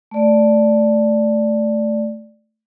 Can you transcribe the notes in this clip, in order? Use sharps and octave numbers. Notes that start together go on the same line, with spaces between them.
A3 D5